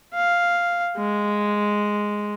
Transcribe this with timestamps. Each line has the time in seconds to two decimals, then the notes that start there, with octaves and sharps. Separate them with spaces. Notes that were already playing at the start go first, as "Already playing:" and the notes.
0.14 F5
0.98 G#3